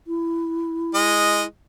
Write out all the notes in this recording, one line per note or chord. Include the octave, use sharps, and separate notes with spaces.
E4
G#3 D#5